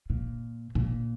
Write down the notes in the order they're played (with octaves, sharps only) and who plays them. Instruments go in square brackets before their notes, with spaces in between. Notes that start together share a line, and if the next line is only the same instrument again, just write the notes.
[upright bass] A#2
A#2